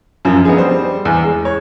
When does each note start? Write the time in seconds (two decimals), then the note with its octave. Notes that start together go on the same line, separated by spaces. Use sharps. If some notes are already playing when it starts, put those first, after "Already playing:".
0.25 F#2 F3
0.45 B3 D#4 G#4
0.57 G3 C5
1.05 E2
1.24 G#3
1.45 C#5